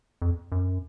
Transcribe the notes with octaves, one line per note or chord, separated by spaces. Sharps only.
F2
F#2